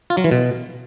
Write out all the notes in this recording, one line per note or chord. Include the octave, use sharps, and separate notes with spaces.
F4
F#3
E3
B2